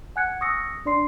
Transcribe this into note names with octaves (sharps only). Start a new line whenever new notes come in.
F#5 G#5 F#6 G#6 C#7
C#6 D#6 E6 A#6 C#7
D4 D5 C6 C7